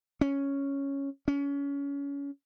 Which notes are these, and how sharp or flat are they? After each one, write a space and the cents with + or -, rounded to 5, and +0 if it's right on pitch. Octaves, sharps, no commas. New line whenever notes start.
C#4 +0
C#4 +25